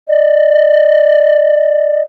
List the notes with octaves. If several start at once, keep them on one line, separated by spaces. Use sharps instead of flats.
D5 D#5